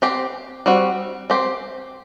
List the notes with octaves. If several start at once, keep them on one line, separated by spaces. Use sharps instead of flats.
C4 G4 C5
G3 C4 F#4
C4 G4 C5